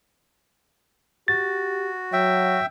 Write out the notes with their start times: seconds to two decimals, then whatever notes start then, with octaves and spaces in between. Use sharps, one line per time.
1.28 F#4 G4 A6
2.13 F#3 E5 G5